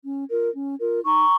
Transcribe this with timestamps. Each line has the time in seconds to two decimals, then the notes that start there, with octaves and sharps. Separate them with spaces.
0.05 C#4
0.29 F4 A#4
0.54 C#4
0.79 F4 A#4
1.04 D#4 A#5 C#6